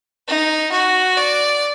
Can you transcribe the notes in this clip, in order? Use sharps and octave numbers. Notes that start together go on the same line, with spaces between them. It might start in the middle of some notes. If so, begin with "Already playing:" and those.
D#4
F#4
D5